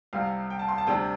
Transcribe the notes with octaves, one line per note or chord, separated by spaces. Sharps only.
C2 C3 G3 F5
G5
A5
C6
A5
D2 C3 G3 D4 G5